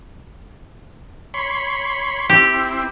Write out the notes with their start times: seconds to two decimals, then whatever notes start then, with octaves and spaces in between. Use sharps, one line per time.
1.34 C#5 B5 C6
2.29 C4 E4 G4